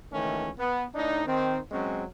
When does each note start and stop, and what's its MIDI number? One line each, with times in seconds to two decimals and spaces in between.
0.12 0.49 37
0.12 0.49 51
0.12 0.49 52
0.12 0.49 57
0.12 0.49 61
0.58 0.84 59
0.95 1.24 45
0.95 1.24 62
0.95 1.24 63
1.26 1.57 51
1.26 1.57 60
1.71 2.03 54
1.71 2.03 56
1.71 2.03 60
1.71 2.03 61